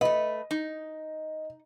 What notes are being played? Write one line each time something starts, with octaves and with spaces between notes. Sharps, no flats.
A3 B4 D#5
D#4